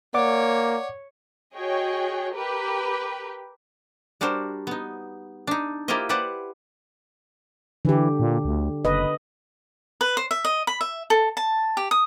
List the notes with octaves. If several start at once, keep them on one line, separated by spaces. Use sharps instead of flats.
A#3 C#5 D5 F#5 D6
F#4 G#4 C#5 D#5 G5
G4 A#4 B4 G5
G3 D4 F#4 A#4 C5
B3 D#4
D4 D#4
A#3 E4 F4 G4 C5 D#5
G4 B4 C5 D5 F#5
D3 E3 G4
A#2
D2
F#1 B4 D#5
B4
C5
E5
D#5
B5
E5
A4
A5
G4
D#6